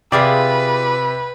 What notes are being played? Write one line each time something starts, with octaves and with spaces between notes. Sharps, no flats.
C3 F4 G#4 B4 D5